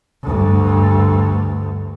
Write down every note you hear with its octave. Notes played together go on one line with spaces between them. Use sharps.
D2 G2